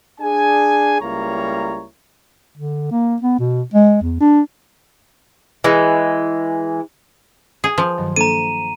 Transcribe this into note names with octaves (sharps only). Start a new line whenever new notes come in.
D4 G#4 G#5
C#2 G3 A#3 E4 C#5 A#5
D3
A#3
B3
B2
G#3
E2
D4
E3 G#3
G#4
F3
G2 D#3 F#3
A#3 D4 A4 A#5 D#7